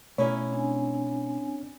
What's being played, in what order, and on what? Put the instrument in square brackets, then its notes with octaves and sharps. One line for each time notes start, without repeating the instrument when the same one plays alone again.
[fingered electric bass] B2 A3 [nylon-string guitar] C#4 D#4 E4 [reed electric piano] C#5 D5
[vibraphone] C4 D4 G#5